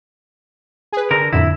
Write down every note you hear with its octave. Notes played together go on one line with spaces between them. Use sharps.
G#4 B4
D3 A#4
F2 A2 D3 E4